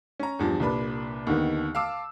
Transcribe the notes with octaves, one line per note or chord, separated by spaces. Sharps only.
C#4 A#5
E2 G2 F3
C2 A#2 D4 B4 B5
D#2 D3 D#3 B3
F5 A5 D6 E6